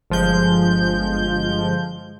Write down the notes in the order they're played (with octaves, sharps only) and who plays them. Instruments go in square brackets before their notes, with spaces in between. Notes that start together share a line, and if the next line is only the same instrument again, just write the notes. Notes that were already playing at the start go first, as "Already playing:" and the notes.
[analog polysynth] G1 F3 G#3 G6